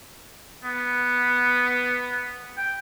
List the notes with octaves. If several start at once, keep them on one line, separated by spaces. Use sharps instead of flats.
B3
G5